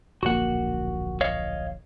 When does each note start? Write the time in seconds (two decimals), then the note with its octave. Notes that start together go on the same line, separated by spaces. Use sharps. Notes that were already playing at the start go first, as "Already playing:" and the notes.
0.23 D1 A#1 A#3 F#4 F#5
1.21 C#5 D#5 F5